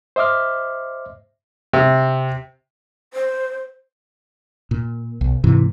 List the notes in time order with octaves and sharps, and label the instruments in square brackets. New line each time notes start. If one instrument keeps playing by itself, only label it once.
[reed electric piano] C5 D#5 E5 D6 F6
[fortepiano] C3
[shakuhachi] C5
[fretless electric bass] A#2
B1
G#2 C3 E3